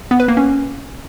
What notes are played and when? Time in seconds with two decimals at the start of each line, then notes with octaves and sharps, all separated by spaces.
0.11 B3
0.20 B4
0.28 A#3
0.37 C#4